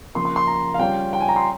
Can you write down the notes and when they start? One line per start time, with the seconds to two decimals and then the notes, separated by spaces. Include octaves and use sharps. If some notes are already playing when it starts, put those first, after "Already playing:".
0.15 C#3 F3 A#3 C6
0.25 C6
0.36 C6
0.47 A#5
0.74 F5
0.79 C#3 G3 C#4 F4 G5
1.13 G5
1.20 G#5
1.28 A#5
1.36 C6